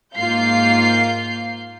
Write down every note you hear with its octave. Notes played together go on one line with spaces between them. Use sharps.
G#2 A#3 F4 F5 G6 C7